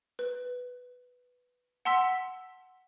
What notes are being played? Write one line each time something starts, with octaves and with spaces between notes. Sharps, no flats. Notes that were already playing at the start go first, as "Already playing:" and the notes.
B4
F#5 A5 C6 E6 B6